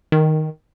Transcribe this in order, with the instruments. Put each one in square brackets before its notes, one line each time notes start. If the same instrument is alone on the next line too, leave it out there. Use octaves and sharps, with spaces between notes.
[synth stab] D#3